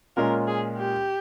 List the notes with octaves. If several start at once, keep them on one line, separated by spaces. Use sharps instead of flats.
A#2 G#3 C#4 F4 A#4
G#4
G4